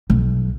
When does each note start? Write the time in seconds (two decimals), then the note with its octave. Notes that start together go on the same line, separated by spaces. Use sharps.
0.10 B1